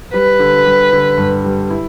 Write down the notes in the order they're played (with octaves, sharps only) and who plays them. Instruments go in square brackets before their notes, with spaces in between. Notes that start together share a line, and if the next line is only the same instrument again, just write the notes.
[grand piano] G3 [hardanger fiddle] B4
[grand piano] D3
G3
D3
G2
G3
E4